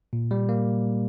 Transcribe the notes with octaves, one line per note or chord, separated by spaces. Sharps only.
A#2
G3
A#3